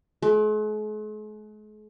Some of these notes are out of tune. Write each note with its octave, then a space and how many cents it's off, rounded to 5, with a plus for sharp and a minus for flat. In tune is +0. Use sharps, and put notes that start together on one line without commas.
G#3 +45